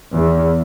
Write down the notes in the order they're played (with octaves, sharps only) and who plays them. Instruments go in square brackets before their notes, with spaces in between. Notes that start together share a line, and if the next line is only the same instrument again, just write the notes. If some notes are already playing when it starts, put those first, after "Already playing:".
[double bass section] E2